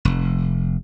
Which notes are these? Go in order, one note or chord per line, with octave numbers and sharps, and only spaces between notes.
F1